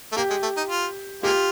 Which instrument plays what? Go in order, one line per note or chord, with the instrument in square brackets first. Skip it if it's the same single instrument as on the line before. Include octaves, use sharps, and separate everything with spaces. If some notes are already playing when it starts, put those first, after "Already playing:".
[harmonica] A3
[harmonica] A#3 [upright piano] G4
[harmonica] G#3
A3
D#4
F4
[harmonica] G#3 A#3 F4 [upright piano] G4